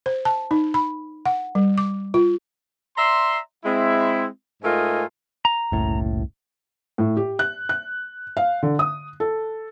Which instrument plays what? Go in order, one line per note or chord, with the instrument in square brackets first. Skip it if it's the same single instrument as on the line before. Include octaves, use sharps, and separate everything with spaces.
[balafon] C5
A5
D#4
B5
F#5
G3
D6
F4
[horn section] D5 E5 A#5 C6
G#3 C4 E4
G#2 A3 F4 A#4 D#5 G#5
[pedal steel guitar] A#5
[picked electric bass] F#1 A2 [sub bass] C2
[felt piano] A2
G4
F#6
F#6
F5
D3
D#6
A4